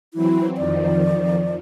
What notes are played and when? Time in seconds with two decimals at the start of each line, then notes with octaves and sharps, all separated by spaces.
0.14 E3 F#3 C4 E4
0.57 F2 D#3 F3 D5